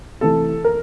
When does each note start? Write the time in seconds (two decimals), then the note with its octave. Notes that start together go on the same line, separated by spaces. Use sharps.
0.21 C3 E3 A3 A4
0.64 A#4